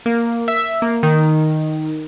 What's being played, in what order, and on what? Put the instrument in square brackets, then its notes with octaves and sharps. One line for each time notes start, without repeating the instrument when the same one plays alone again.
[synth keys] A#3
E5
A#3
D#3